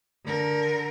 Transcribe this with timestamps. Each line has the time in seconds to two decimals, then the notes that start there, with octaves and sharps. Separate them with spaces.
0.25 D3 A#4